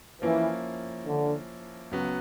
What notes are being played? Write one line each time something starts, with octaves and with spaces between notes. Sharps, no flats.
E3 F3 A#3 C#4 E4
D3
C#2 C#3 F#3 B3